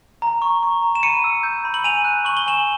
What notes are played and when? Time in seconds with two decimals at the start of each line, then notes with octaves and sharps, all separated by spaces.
0.22 A#5
0.42 C#6
0.63 C#6
0.82 A#5
0.95 E7
1.03 B5 C#7 D#7
1.24 E6
1.43 G6
1.65 B5
1.74 F#7
1.84 G#5 D#7 F7
2.04 F#6
2.25 C#6 F#7
2.37 G7
2.46 G#5 E7 F#7